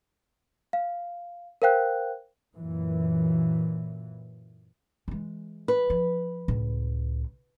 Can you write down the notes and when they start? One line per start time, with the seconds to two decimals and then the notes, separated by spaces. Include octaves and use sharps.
0.73 F5
1.62 A#4 C5 F5 G5 F#6
2.55 F#2 A#2 E3
5.08 E3 G#3
5.68 B4
5.90 F3
6.48 C#2 A2